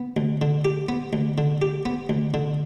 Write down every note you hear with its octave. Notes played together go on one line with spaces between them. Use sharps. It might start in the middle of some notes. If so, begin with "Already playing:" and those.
Already playing: B3
D2
D3
G4
B3
D2
D3
G4
B3
D2
D3